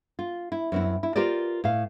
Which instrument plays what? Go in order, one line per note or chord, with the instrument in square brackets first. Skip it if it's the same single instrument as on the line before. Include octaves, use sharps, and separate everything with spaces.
[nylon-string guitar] F4
E4
F#2 C4 E4
E4
F4 G4 A#4 C5 D5
A2 F5